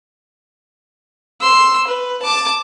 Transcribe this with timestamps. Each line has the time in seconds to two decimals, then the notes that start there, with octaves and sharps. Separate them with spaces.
1.41 C6 E6
1.88 B4
2.22 A5 D6